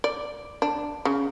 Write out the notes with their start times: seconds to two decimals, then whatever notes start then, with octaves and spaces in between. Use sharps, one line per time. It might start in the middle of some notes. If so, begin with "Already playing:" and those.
0.04 D5
0.62 D4
1.05 C#3